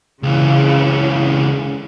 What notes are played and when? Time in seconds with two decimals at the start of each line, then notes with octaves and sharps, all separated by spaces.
0.23 C#2 C#3 E3